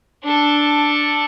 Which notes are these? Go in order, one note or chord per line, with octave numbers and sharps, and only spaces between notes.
D4 A4